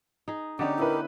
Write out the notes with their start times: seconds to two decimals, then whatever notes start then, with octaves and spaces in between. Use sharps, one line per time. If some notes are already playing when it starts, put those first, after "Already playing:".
0.28 D#4 G#4
0.59 D3 B3 C#4 D#4 G4 D5
0.79 E4 A#4 B4